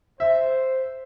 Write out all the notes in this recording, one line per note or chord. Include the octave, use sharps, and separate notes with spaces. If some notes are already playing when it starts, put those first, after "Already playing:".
C5 E5